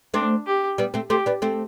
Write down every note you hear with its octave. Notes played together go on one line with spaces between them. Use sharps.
A3 C4 D4
G4
G3 B3
A3 C4
A3 C4 G4
B3 D4
A3 C4